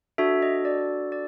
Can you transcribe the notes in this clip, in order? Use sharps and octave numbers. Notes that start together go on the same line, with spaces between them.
D4 F#4 A4 E5
D#5
D5
D5